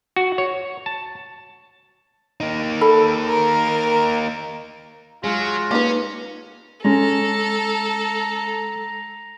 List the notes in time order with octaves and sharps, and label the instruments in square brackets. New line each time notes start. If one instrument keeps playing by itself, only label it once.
[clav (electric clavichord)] F#4
C#5
A5
[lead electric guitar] A#3 D#4
[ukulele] A4 B5
[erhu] A#4
[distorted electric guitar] F#3 [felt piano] G#3 [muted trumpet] F4
[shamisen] A#3 D#4 B4 [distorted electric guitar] C#4
[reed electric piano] G#3 [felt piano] C#4 [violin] A4 [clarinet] A#5